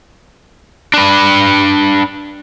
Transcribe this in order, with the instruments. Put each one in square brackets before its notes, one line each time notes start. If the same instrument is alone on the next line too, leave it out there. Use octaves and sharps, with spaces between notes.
[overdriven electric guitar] D4 B4